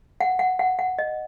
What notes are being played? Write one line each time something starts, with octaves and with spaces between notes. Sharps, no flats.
F#5
F#5
F#5
F#5
D#5